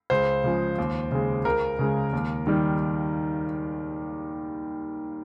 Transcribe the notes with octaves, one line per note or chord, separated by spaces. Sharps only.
C#2 C5
C#3 F3 G#3
D#2
C#3 G#3
C#2 A#4
C#3 G#3
D#2
D#3 G3